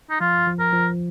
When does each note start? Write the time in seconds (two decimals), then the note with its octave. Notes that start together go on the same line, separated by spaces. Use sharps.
0.11 D#4
0.21 F3 F4
0.47 F3
0.60 A#4
0.73 F3